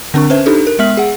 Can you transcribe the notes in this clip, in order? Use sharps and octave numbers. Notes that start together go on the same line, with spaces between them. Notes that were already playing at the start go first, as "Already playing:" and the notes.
D3 C4 D4 A#4 C#6
C#4 B4 C5 E5
D4 D#4 G4 A4
A#4
G#3 B3 E5 F6 B6 F#7
G#4 F#5